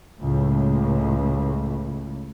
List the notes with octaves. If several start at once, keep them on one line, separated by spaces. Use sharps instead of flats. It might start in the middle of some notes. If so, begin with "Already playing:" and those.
C#2 A2